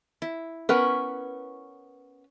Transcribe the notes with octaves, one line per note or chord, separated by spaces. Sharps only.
E4
B3 C#4 A#4 B4